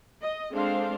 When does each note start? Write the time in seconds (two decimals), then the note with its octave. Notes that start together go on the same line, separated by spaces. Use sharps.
0.22 D#5
0.51 G#3 C4 D4 A4 C5 F5